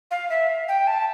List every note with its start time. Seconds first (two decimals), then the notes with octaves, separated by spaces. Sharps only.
0.11 F5
0.30 E5
0.68 G5
0.87 A5